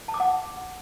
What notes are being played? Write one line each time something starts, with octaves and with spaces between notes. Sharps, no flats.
A5
D6
F#5